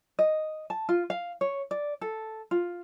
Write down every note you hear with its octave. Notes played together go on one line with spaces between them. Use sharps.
D#5
A5
F4
F5
C#5
D5
A4
F4